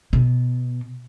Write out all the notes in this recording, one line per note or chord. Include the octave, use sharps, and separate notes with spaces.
B2